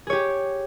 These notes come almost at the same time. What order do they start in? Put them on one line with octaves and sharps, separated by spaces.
G#4 C#5 G4